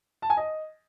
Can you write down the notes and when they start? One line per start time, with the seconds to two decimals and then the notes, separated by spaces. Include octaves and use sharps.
0.22 A5
0.30 G#5
0.37 D#5